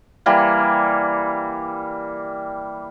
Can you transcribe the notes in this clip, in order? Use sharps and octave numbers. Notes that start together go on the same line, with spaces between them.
E3 G3 A#3